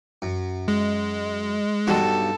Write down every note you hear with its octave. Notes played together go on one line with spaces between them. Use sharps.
F#2
G#3
B1 G2 F#4 A4